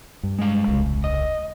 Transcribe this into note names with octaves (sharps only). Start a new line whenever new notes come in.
G2
G#3 F5
D#1 C2 C#3
D#5